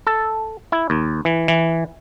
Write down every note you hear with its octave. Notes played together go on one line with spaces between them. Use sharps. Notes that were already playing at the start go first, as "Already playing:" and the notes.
A4
E4
D#2
E3
E3